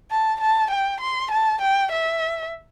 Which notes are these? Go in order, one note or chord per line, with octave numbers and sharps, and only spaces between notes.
A5
A5
G5
C6
A5
G5
E5